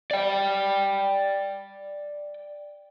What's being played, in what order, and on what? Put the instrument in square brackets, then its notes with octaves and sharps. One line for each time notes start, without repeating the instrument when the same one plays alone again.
[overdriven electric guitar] D5 G5